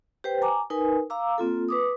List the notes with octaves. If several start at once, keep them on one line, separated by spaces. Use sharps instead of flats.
G4 B4 C5 G5
G#5 A#5 D6
D#4 A#4 B4 G#5
F5 A#5 D6 E6
A#3 C4 F4 A4
B4 D6 D#6